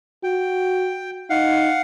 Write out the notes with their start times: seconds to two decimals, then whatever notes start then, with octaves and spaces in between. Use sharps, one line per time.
0.23 F#4 G5
1.30 D#4 F5 F#5